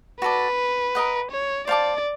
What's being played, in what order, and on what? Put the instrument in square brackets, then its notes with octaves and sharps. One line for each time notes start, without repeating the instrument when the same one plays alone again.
[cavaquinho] F#4 A4 D5 [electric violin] B4
[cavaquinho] A#4 D#5 F#5
[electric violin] C#5
[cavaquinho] C5 F5 A5 D6 [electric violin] D5